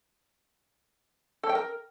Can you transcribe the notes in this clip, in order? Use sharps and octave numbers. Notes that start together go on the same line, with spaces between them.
A4
G5
A#4